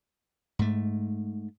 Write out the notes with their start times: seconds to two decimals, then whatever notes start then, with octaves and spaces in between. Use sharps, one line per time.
0.59 G#2 A3